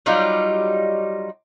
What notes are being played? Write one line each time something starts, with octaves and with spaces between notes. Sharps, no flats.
F#3 G3 D#4 F4